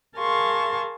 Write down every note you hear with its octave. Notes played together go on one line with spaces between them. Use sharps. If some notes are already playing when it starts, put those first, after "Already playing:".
G#4 A#4 F5 A5 C6 C#6